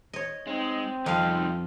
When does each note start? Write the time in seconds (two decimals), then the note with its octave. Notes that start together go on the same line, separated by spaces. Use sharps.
0.13 C#5 D#5
0.47 G#3 C4 D#4
1.06 C2 F2 D#4 F4 F5